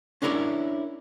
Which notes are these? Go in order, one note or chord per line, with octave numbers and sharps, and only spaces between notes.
C#4 D4 E4 A#4 B4 C#5